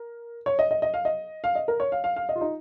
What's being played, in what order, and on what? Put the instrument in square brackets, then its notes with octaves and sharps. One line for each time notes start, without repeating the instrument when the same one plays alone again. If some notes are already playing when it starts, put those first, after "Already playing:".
Already playing: [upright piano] A#4
C#5
D#5
D#5
D#5
F5
D#5
F5
D#5
A#4
C#5
F5
F5
F5
D#5
F4
D#4